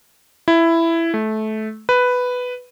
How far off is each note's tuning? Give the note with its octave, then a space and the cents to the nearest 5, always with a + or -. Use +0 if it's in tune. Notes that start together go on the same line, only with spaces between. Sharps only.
E4 +10
A3 -20
B4 +5